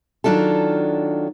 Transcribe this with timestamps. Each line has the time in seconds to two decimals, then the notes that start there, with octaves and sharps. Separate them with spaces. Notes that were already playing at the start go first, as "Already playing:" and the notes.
0.24 D#3 F#3 D4 F4 A4